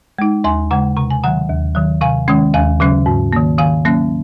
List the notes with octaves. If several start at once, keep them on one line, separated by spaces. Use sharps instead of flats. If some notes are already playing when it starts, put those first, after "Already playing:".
G#3 D#4
D#2 G#5 C6
C#3 G#3 F#5 A#5
C3 A#5
G#5
D#3 F#3 F#5 A#5
D#2
D#3 F#3
C3 F5 G#5
D#3 G#3 C#4
D#2 F5 G#5
C#3 F#3 C#4
G#2
D#3 A#3
D#3 F5 G#5
F#3 A#3 C#4